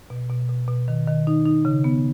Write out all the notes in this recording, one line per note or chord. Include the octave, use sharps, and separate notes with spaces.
B2
B2
B2
B2
D#3
D#3
D#4
D#4
C#3
B3